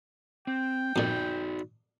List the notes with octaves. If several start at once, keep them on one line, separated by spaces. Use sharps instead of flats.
C4 G5
F2 A#2 D#4 F#4 D5